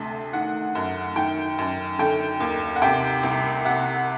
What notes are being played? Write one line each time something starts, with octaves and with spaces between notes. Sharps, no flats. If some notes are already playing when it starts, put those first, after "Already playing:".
Already playing: D2 C3 A5
D#3 F#5
F#2
D#3 G5
F#2
D3 G5
D#2
F#5
C3 G5
C2
C3 F#5